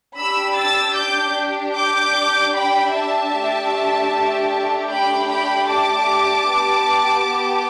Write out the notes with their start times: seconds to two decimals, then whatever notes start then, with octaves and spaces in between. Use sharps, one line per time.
0.16 D4 G4 B5 E6
0.56 E6 A6
0.96 D6 G6
1.74 D6 G6
2.54 G5 B5
2.93 E5 A5
3.33 A3 D4 G4
4.90 G5 B5
5.29 G5 B5
5.69 A5 D6
6.49 B3 G4